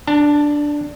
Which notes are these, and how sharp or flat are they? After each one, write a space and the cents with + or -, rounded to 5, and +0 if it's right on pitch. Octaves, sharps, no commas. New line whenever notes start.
D4 +0 A5 +40